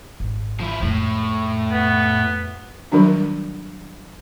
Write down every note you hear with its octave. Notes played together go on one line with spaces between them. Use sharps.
G#1
F3 E4
F2 A2 G#3
B3
D#3 F#3 G3 D4 F#4